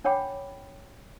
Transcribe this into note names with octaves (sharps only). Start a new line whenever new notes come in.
D4 C#5 F#5 G5 B5 D6